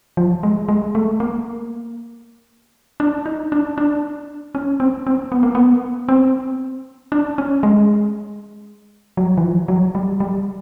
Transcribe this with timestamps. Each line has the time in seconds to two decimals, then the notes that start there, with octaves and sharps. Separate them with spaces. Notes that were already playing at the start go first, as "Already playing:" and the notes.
0.17 F3
0.43 G#3
0.68 G#3
0.95 A3
1.20 A#3
3.00 D4
3.26 D#4
3.52 D4
3.78 D4
4.55 C#4
4.80 C4
5.07 C4
5.32 B3
5.43 A#3
5.55 B3
6.09 C4
7.12 D4
7.38 C#4
7.63 G#3
9.17 F#3
9.38 E3
9.43 F3
9.68 F#3
9.95 G3
10.20 G3